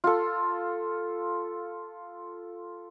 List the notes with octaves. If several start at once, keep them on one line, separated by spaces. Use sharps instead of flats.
F4 A4